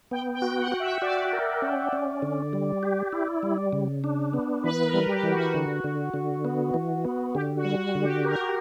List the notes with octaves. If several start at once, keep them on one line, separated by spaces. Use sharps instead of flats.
B3 G5
G5
F#4
F#5
F#4
E5
F#4 D5
A#4
C#4
C#4
D3
G3
G4
E4
G3
C#3
D4
B3
E3 B4
A#4
G3
G4
E3
F#4
D3
D3
D3
B3
E3
B3
D3 G4
F#4
G3
F#4
D3
G4
G4 A#4